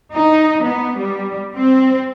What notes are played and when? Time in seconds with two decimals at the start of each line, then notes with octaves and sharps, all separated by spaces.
0.14 D#4
0.64 B3
1.00 G3
1.56 C4